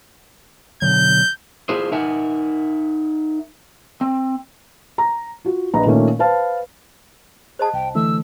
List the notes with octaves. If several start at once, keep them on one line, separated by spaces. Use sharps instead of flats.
B2 D3 F#3 G6
E4 F4 G#4 C5
D#4 A#4 E5 F#5 G#5
C4
A#5
F4 F#4
A#1 B4 D#5 A#5
A#2 D#3 A3 A#3 C#4
B4 C5 F5 A5
G#4 C5 D#5 A5
C2 G5
D3 E3 A3 E6